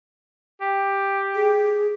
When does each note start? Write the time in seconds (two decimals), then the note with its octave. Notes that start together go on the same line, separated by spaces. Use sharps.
0.61 G4
1.35 G#4